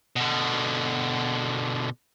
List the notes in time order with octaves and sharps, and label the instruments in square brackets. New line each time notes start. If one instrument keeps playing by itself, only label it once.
[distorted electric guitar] B2 D3